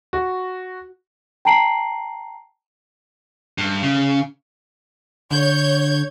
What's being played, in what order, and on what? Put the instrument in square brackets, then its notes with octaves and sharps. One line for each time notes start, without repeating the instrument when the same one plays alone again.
[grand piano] F#4
[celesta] G5 A5 A#5 C7 D7 F#7
[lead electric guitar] G2
C#3
[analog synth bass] D3 [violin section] C#5 G6 G#6